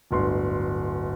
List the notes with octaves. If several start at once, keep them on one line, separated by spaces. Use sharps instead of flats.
D1 G1 C6